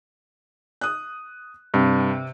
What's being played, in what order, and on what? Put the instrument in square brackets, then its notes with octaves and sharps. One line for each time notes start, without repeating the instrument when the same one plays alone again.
[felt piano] D#6 F#6
[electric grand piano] G2 [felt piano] C3